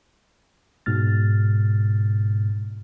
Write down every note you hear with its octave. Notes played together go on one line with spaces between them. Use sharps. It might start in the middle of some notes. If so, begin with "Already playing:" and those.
G#2 B2 F6 A6